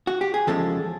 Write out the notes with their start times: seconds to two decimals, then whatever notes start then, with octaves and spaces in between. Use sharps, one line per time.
0.07 F#4
0.21 G4
0.34 G#4
0.47 E2 C#3 F3 G#3 A4